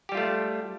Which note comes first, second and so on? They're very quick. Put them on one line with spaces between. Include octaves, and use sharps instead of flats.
G4 G3 F4 A3